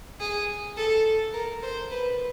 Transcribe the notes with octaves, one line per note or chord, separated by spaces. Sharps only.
G#4
A4
A#4
C5
B4